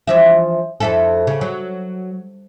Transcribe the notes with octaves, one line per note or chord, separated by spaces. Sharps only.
E3 F3 E5
F2 E4 A4
C#3
F#3